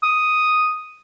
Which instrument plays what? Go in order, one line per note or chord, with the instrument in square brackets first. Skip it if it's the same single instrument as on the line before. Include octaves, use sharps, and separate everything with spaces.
[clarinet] D#6